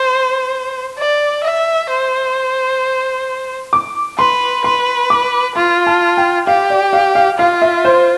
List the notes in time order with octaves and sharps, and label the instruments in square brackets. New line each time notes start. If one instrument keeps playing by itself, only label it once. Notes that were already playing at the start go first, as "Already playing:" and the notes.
Already playing: [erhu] C5
D5
E5
C5
[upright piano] D6
[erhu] B4 [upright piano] C6
[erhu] B4 [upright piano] C6
[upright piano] D6
[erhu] F4 [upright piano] C6
[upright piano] A5
G5
[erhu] G4 [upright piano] F5
[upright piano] D5
F5
F5
[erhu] F4 [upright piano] F5
[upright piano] E5
C5